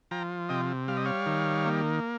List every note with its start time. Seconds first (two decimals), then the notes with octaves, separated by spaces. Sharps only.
0.11 F3 G5 A#5
0.49 C3 D#5 G5
0.88 G3 F5
0.97 D#5
1.05 C#5 F5
1.26 D#3
1.65 A#3